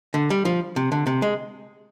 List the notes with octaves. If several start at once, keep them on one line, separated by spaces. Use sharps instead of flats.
D3
G3
F3
C3
D3
C3
G#3